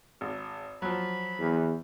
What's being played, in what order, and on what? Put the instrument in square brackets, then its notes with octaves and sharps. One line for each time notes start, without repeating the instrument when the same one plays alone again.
[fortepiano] G#1
[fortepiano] F3 F#3 [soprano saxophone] B5
[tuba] E2